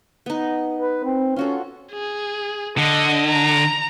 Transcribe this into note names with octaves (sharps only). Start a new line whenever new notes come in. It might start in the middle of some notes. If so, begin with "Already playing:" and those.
B3 D#4
B4
C4
C#4 F4 F#4 A4
G#4
D3 D#5
A#5